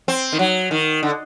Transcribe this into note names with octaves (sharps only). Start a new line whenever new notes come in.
C4
D#3
F#3
D#3
D3